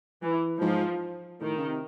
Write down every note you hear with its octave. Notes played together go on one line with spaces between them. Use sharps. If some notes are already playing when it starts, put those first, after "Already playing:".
E3
G#2 F3
A2 D#3
C#3
C3